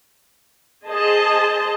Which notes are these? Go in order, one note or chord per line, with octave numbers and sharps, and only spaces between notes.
G#4 C5 D#5 A5